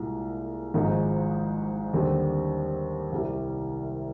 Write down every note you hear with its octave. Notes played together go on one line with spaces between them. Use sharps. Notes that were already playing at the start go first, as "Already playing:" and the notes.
Already playing: C2 A#2 G#3
G#1 G#2 F3 G#3 D#4
D#2 D3 G3 C4
C2 C3 G3